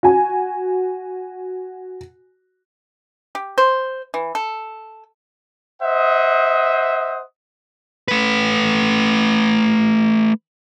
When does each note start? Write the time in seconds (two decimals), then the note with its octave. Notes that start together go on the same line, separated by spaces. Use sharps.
0.03 F#4 G#5
3.35 G4
3.58 C5
4.14 E3
4.35 A4
5.83 C5 D#5 E5 F#5 D#6
8.08 A3 B4